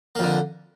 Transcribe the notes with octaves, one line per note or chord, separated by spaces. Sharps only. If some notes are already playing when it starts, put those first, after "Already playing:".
F2 D3 A#3